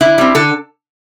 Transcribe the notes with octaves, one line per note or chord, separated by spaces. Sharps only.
D3 E4
G3 C4
D3 A4